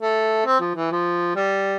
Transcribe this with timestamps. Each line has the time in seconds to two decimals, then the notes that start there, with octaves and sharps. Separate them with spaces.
0.01 A3
0.45 C4
0.60 F3
0.75 E3
0.91 F3
1.36 G3